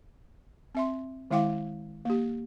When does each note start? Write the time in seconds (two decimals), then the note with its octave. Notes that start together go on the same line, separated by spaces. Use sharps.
0.75 C4 E5 C6
1.31 D#3 G#3 E4 F5 G5 D6
2.05 A#3 G4